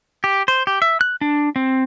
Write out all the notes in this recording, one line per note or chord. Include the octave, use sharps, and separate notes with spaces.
G4
C5
G4
E5
F#6
D4
C4